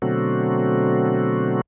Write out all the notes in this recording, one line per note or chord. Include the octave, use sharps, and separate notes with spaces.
B2 D3 F#3 A3 C4 F#4